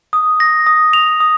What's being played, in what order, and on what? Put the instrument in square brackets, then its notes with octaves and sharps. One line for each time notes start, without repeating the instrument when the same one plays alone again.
[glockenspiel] D#6
A#6
D#6
F7
D#6